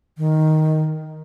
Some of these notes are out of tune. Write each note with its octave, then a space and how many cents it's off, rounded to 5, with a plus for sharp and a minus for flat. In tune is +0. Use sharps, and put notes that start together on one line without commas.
D#3 +5